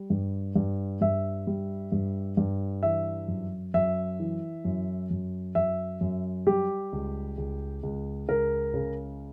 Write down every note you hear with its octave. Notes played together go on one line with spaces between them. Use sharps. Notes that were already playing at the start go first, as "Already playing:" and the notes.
Already playing: G3
G2
G2
G2 E5
G3
G2
G2
E3 E5
F#2
F#2 E5
E3
F#2
F#2
F#2 E5
F#2
G3 G4
C#2
C#2
C#2
C#2 A#4
C#3